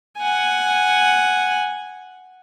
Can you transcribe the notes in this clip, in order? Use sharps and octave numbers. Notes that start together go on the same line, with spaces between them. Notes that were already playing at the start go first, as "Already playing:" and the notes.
F#5 G#5